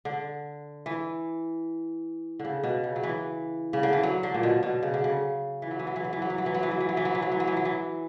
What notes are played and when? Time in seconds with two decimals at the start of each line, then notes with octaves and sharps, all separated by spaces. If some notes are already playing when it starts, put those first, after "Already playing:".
0.05 D3
0.86 E3
2.39 D3
2.45 C#3
2.63 B2
2.84 C#3
2.96 F#3
3.03 E3
3.73 C#3
3.83 D3
3.93 E3
4.03 F#3
4.23 D3
4.34 A#2
4.43 B2
4.63 B2
4.82 C#3
4.94 D3
5.04 C#3
5.62 E3
5.71 F#3
5.79 E3
5.87 F#3
5.96 E3
6.04 F#3
6.13 E3
6.22 F#3
6.30 E3
6.38 F#3
6.46 E3
6.54 F#3
6.63 E3
6.71 F#3
6.80 E3
6.89 F#3
6.97 E3
7.05 F#3
7.15 E3
7.22 F#3
7.32 E3
7.40 F#3
7.47 E3
7.57 F#3
7.65 E3